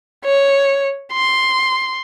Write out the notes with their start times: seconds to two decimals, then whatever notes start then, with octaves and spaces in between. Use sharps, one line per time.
0.25 C#5
1.13 C6